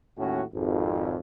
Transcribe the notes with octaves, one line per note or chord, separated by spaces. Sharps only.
D#2 A2 C#4 F#4
G#1 F2